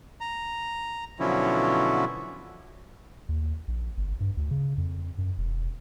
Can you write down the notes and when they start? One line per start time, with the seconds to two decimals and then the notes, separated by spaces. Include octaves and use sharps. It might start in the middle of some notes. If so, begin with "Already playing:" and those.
0.21 A#5
1.20 B2 D3 F3 F#3 C#4 E4
3.29 D#2
3.68 A#1
3.97 G1
4.20 G2
4.37 D2
4.51 C#3
4.78 F2
5.18 F#2
5.38 E1